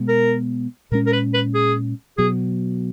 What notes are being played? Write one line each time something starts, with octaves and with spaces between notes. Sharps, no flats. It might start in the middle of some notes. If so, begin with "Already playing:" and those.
Already playing: B2 G#3 B3
A#4
A#2 G#3 C#4 A#4
A#4
B4
B4
G#4
B2 F#3 G#4